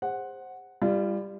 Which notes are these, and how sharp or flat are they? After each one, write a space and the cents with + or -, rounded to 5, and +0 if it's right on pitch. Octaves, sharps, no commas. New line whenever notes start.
G#4 -40 C5 +15 F#5 +0
G3 +15 F4 -30